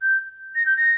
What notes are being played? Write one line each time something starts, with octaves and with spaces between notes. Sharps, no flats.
G6
A#6
G6
A#6